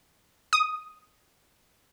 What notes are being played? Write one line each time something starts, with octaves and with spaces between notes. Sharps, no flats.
D#6